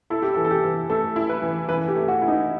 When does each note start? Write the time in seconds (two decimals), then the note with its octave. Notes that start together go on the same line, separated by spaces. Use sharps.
0.10 E4 A4
0.22 G4
0.34 E3 A4
0.44 A4
0.51 G4
0.64 E3
0.90 A3 A4
1.16 E4
1.29 B4
1.42 E3
1.69 E3 B4
1.88 G4
1.95 A3
2.08 F#4
2.22 E4
2.28 D#4